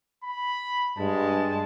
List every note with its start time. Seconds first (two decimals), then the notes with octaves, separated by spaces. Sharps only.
0.24 B5
0.98 G2 G#3 A5